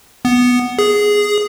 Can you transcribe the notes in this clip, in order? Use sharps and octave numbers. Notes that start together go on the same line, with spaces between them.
B3
G#4